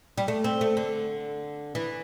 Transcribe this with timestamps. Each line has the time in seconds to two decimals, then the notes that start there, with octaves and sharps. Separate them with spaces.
0.18 G3
0.28 A3
0.44 C4
0.61 A3
0.77 D3
1.75 E3